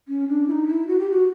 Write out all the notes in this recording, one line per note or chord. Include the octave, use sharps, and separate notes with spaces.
C#4
D4
E4
D#4
E4
F#4
G4
F#4